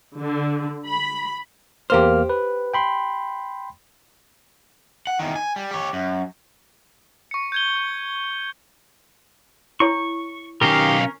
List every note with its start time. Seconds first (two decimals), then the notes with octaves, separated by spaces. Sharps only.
0.19 D3
0.86 B5
1.90 E2 A#3 G4 C5 F6
2.29 B4
2.74 G5 B5 C6
5.07 F#5
5.19 E2 D#3
5.36 G#5
5.56 G3
5.71 G4 C#5
5.93 F#2
7.31 C#6 C#7
7.52 G6 G#6 G7
9.80 E4 C#5 C#6
10.61 B1 D#3 C#4 G4 A#4 F5